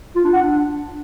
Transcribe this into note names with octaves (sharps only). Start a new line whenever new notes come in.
F4
D4
F#5
D4